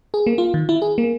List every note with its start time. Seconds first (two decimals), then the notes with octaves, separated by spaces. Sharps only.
0.14 G#4
0.27 A#3
0.38 F4
0.54 D#3
0.69 E4
0.82 G#4
0.98 A#3